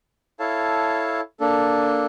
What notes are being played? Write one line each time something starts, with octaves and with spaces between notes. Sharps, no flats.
E4 A4 C#5 F5 A5
A#3 D4 A4